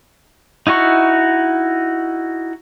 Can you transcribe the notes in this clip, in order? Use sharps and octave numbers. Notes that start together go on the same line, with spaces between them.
D#4 E4 F#4 C#6